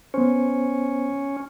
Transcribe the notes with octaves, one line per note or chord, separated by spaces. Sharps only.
B3 C#4 C5